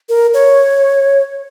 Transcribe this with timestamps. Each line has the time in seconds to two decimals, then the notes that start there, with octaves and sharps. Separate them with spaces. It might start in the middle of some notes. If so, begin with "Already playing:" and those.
0.09 A#4
0.34 C#5